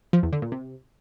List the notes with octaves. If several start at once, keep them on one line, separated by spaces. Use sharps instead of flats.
F3
E2
D3
A#2
C3